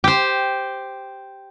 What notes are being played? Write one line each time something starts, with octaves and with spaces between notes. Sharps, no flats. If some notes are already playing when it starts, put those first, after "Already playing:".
G4 C5